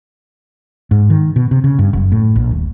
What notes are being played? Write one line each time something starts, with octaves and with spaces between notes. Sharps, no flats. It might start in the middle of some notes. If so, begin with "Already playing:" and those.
G#2
D#3
B2
C3
C#3
G2
F#1
A2
A#1
D#1